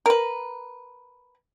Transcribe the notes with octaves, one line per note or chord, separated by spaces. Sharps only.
A#4 B4